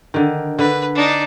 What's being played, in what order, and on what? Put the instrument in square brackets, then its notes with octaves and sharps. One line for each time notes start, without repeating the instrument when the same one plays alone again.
[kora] D3 D#3
[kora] D3 [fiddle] B4
[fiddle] D4 D#4